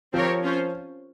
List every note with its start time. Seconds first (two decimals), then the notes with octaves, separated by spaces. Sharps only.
0.14 F3 C4 G4 A#4 C#5
0.43 C#4 F4 C5